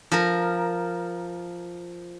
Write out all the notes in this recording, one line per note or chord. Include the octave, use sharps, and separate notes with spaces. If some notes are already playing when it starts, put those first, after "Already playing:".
F3 A#4